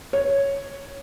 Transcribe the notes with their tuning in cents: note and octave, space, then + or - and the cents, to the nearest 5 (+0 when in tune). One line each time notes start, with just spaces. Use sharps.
C#5 +0